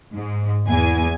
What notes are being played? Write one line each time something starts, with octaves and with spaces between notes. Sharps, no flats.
G#2
E2 G#5